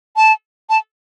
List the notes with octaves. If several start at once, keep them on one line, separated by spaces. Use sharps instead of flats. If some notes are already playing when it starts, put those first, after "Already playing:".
A5
A5